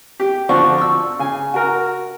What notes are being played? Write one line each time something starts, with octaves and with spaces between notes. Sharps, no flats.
G4
D3 F3 F#4 D5 C#6
C#6 E6
C#3 G#5
F#4 A#4